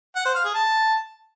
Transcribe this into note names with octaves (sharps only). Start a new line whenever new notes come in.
F#5
C5
F5
G#4
A5